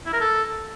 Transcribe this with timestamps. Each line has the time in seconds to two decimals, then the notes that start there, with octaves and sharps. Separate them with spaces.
0.06 E4
0.13 A#4
0.20 A4